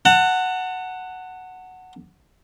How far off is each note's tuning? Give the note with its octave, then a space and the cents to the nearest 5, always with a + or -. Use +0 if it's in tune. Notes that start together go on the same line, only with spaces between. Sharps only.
F#5 +0 A5 +35